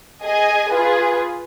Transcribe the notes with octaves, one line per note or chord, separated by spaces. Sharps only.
G#4 D#5 G#5
F4 G#4 B4